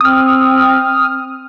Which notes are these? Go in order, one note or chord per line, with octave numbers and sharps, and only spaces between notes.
C4 D#6 F6